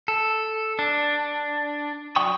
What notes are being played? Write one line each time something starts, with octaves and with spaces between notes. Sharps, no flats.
A4
D4
F#3 D5 G5 C#6 D#6